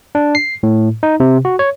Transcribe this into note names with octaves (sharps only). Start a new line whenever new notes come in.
D4
C7
A2
D#4
C3
F#4
C#5